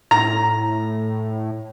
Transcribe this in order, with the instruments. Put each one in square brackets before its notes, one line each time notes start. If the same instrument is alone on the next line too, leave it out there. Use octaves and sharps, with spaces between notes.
[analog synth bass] A2 [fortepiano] A#5